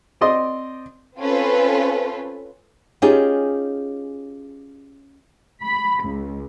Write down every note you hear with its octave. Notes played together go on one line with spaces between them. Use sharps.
C4 D5 D#5 C6
C4 C#4 F4 A4 B4
C#4 D#4 F4 G4 G#4
B5
C#2